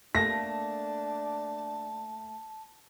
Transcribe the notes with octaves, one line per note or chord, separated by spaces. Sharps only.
A3 A#3 D4 A5 A#6